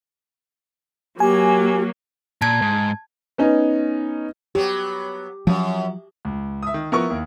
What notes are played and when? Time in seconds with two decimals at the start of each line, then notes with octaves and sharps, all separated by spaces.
1.20 F#3 A#3 G4 G#5
2.42 A#2 A5 G#6
2.62 G#2
3.38 B3 C#4 D#4
4.55 F#3 B3 G4
5.47 F#2 F3 F#3
6.25 C#2
6.63 E5 D#6
6.74 D#3
6.92 F3 B3 E4 A#4 C#6
7.10 D#2